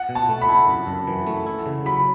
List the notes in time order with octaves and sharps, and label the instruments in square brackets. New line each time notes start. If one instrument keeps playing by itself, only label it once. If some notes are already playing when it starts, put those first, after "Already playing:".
Already playing: [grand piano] F#5
[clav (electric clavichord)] B2
[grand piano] A5
[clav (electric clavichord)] A3
[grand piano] B5
[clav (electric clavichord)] E4
F#2
F#2
E3
A3
E4
C#3
[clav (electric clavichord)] F#3 [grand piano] B5